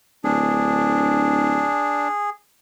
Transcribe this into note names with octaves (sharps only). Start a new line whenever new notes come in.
D1 D4 G#4